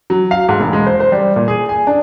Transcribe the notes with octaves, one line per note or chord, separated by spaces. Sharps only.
F#3
F5
G#2
E1
G#3
C5
C5
G3
A#2
G#4
G#5
D4